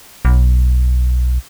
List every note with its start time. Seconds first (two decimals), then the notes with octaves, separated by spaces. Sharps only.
0.25 B1